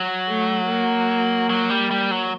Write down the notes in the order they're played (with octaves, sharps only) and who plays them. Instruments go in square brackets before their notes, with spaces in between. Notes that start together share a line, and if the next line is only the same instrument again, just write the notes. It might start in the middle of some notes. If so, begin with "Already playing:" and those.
Already playing: [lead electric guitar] F#3
[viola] A3
A#3
[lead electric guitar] F#3
G3
G3
F#3